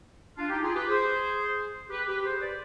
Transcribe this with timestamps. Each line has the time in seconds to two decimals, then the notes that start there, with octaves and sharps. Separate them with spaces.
0.37 D4 F4
0.49 D#4 G4
0.62 F4 G#4
0.75 G4 B4
0.88 G#4 C5
1.90 G4 B4
2.07 G4 B4
2.24 G#4 C5
2.41 B4 D5